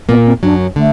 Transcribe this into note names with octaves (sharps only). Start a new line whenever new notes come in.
A#2 A#3 B3
C4
F#2 F#3 D4
D3 A3